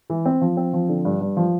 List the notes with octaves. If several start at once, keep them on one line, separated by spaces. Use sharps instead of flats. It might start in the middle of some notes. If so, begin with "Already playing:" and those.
E3
C4
F3
C4
F3
D3
G2
G2
F3